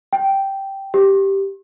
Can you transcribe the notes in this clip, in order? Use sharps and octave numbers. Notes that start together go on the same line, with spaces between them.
G5
G4